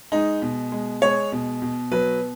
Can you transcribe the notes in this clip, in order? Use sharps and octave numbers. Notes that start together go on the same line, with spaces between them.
G#3 D#4
B2
G#3
G#3 C#5
B2
B2
F#3 B4